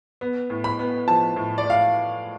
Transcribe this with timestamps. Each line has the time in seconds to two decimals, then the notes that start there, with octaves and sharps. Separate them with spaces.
0.21 B3
0.50 A2
0.64 B5
0.79 B3
1.07 F3 A5
1.36 A2
1.58 D5
1.65 A2 F5